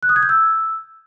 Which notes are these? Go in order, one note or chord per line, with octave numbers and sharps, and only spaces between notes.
F#6
D#6
G#6
G6
E6